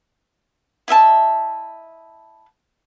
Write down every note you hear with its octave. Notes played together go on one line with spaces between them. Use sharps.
E4 D#5 E5 A5